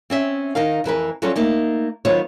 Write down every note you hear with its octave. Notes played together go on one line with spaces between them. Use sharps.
C4 C#4 E5
D#3 D#4 A#4 F5
F2 E3 A#4 B4
F#3 G3 C#4 F4 A4 C#5
A3 A#3 D#4
D#3 F#3 B3 F4 C5 C#5